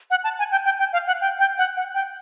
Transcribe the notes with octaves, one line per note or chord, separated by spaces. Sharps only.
F#5
A5
G#5
G5
G5
G5
F5
F#5
G5
G5
F#5
F#5
G5